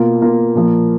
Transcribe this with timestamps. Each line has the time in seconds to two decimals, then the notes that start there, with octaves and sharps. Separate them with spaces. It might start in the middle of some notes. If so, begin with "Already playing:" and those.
Already playing: B2 A#3 F4
0.22 B2 A#3 F4
0.55 A#2 F3 A#3